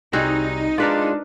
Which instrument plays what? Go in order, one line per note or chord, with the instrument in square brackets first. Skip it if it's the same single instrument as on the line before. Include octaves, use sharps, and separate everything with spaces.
[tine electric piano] C2 G3 [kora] C4 F#4 G#4 [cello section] D#4
[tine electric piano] G#3 F4 [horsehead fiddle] D4 [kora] A#4 B4 D5